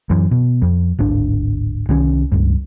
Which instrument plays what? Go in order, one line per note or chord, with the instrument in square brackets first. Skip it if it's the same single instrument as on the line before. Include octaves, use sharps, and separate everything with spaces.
[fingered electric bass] F#2 E3
B2
F2
D1 G#1 D4
C2 D#3 C#4
C#2 G2